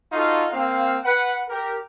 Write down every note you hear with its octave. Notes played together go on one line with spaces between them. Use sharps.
D#4 F4 F#4 A4 F5
A#3 C4 F5
B4 F#5
G4 A#4